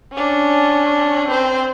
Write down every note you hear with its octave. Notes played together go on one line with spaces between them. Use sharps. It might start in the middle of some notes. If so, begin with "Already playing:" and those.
C#4 D4
C4 C5